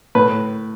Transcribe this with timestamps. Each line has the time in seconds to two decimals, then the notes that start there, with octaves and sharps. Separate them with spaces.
0.15 A2 B4